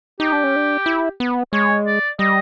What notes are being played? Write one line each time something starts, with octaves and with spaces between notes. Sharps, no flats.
D#4 G4
D4
C#4
D4
E4
B3
G#3 C#5
D5
G3 D#5